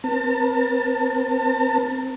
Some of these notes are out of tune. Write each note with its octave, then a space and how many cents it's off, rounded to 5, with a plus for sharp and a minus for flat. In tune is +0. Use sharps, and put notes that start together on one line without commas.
C4 +0 A#4 +45 A5 +35